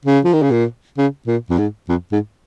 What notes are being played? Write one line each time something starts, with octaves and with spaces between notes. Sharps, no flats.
C#3
F3
D#3
C#3
A#2
C#3
A#2
F2
G#2
F2
G#2